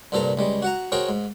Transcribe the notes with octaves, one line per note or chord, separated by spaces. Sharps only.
C2 G2 A#2 A4 C5 A#5
C#2 G3 G#3
F#4 F#5 A#5
F#4 G#4 A#4 C5 C#5 G5
G#2